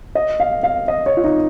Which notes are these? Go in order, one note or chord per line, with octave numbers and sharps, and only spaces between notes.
D#5
F5
F5
D#5
C#5
F4
D#4